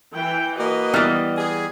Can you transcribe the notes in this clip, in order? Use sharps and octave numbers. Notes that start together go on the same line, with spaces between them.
E3 G5
A#3 F#4 B4 D#5
E3 G3 B3 F6 A6
G#4